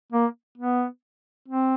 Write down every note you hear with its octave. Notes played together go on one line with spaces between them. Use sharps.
A#3
B3
C4